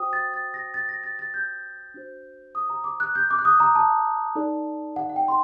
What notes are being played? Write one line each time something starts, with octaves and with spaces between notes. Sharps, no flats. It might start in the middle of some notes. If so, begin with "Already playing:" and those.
Already playing: F#4 C5 G5 D#6
A6
A6
A#6
A6
A#6
A6
A6
G6
D4 F#4 C5
D#6
A#5
D6
F#6
G6
D6
F#6
D#6
A#5
A5
D#4 A4 D5
F#5
F#5
G5
C6